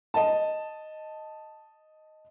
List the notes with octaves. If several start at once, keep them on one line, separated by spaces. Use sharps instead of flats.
D#5 A5